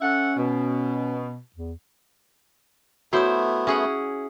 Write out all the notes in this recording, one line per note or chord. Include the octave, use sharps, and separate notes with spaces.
C#4 A4 E5 F#5
B2
E2
A3 B3 E4 F#4 C5 C#5 D#6
C#4 G#4 E5 F#5